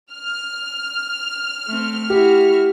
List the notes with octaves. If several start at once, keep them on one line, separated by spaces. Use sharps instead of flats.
F6
A3 C4
E4 F#4 G4